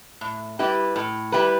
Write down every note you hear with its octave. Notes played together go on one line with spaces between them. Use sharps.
A2
G3 E4 G4 B4
A2
G3 E4 G4 B4